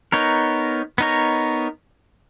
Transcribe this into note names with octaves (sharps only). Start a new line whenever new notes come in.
B3 D#4 A#4 C#5
B3 D#4 A#4 C#5